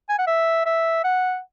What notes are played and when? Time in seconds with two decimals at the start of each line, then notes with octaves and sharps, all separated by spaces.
0.09 G#5
0.19 F#5
0.27 E5
0.66 E5
1.04 F#5